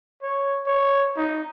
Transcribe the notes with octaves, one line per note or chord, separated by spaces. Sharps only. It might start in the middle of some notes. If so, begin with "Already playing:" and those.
C#5
C#5
D#4